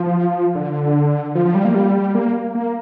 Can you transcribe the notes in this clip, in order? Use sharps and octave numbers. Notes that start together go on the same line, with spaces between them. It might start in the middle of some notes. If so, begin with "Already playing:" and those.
Already playing: F3
D3
F3
F3
G3
A#3
G3
A#3
A#3